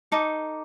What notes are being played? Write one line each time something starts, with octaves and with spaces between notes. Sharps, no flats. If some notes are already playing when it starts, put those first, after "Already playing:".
D#4 A4 D6